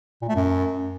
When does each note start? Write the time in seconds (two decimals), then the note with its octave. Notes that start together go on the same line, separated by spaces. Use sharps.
0.22 A#2
0.29 A3
0.36 F#2